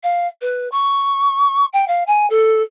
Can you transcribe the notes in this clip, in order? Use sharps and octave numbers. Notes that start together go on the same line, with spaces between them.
F5
B4
C#6
G5
F5
G#5
A4